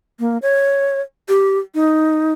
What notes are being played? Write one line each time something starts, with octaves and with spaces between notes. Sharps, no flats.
A#3
C#5
G4
D#4